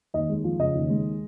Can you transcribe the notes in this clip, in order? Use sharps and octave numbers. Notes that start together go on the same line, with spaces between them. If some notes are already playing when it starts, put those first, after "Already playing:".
D#2 D#5
G#3
F3
C#3 D#5
D#2
G#3